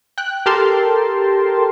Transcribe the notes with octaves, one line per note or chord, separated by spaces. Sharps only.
G5 F#6
G4 A4 A#4 G5 A5 C6